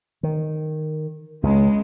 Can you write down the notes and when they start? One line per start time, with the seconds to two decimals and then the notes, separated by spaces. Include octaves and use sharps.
0.23 D#3
1.43 C#2 C#3 G#3